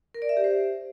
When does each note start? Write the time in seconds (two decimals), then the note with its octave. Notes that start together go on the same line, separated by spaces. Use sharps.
0.14 A#4
0.22 D5
0.29 E5
0.37 G4
0.44 C5